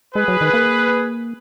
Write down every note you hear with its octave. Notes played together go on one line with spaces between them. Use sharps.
G#3 G#4 B4
F#3
D#3
A#3